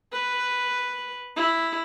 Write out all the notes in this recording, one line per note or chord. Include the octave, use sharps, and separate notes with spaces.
B4
E4